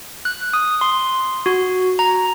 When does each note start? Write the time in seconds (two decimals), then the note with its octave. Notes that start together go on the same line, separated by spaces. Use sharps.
0.25 F#6
0.54 D#6
0.81 C6
1.46 F#4
1.99 A#5